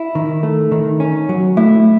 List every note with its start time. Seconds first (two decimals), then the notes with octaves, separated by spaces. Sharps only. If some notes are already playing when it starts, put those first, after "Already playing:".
Already playing: E4
0.15 D#3
0.43 A3
0.72 D#3
1.00 C#4
1.29 F#3
1.57 A3 E4